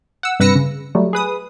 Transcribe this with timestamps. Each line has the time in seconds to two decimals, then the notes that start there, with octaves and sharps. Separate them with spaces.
0.23 F#5 E6
0.40 G2 C3 B4 E6 A#6 C#7
0.55 C#3
0.95 F#3 G3 A3
1.13 G#4 B4 D#6